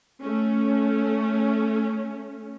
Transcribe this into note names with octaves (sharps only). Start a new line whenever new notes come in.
A3 C#4